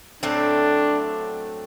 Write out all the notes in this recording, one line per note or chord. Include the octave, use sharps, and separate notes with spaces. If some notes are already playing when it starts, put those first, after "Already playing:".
A2 F#3 A3 C4 D4